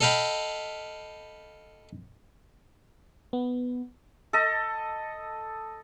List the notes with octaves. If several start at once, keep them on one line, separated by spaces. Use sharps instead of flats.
A4 D#5 F5 G5 B5
B3
A4 D#5